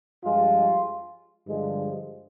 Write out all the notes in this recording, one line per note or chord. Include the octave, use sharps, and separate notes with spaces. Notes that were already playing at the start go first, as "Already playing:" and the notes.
G2 F3 G#3 F4
G2 D3 F3 G#3